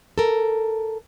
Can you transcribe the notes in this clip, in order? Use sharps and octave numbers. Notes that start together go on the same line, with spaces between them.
A4 A#4